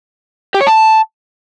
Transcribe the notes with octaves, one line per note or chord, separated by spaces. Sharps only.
G4
C#5
A5